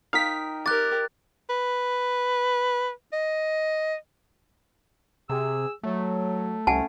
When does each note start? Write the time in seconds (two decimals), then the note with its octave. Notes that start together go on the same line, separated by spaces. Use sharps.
0.13 D#4 A#4 F5 G5 B6
0.66 G4 A#4 D6 F#6 A6
1.50 B4
3.13 D#5
5.30 C3 G#4 E6
5.83 F#3 A3
6.67 C2 A3 C#4 F#5 G#5 A5